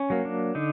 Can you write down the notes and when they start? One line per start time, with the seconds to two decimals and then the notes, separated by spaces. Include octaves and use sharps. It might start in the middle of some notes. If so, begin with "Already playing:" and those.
Already playing: C#4
0.10 F#3 A#3
0.25 D4
0.55 D3 D#4